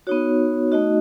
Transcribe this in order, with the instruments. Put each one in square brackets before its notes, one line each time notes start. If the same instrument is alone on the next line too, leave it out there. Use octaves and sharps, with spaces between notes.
[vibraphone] B3 D#4 F#4 C#5
A3 D#4 F#4 D#5